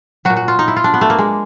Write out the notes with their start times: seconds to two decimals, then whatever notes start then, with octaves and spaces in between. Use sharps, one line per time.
0.25 A#2 F#3 F#4
0.36 F#4
0.48 F4
0.59 D#4
0.68 E4
0.76 F4
0.84 D4
0.94 B3
1.01 A3
1.10 A#3
1.19 G#3